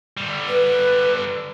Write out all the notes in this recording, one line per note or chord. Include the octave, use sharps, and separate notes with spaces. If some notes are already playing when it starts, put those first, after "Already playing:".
D3 G3
B4